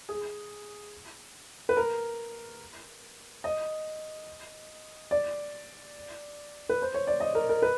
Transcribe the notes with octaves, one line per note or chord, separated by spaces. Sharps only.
G#4
B4
A#4
D#5
D5
B4
C5
C#5
D5
D#5
A#4
A#4
B4